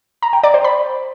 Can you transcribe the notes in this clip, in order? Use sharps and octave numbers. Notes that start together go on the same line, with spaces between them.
A#5
G5
D5
C5
B5